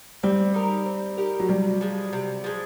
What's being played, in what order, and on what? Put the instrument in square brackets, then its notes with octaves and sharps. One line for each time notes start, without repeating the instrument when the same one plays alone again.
[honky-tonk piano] G3 [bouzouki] C4
[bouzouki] D#4 G4 A#4
C4
D#4 G4 A#4
[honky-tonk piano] F#3
[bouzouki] C3 [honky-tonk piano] G3
[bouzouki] F3 G#3
C3
F3 G#3